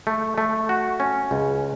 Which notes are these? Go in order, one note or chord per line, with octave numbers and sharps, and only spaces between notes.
A3
A3
F#4
C#4
C#2